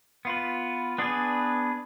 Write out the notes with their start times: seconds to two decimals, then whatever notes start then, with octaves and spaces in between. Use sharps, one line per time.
0.25 B3 F4 B4
0.98 B3 D4 G#4 B4